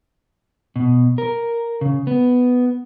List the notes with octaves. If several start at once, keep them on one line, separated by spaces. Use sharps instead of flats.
B2
A#4
C#3
B3